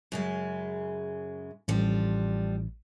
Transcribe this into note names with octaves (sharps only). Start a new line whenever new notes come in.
F#2 C#3 G#3
A1 F3 G3 D4